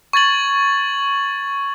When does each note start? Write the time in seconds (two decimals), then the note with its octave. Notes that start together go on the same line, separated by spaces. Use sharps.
0.13 C#6 G#6 A6 F#7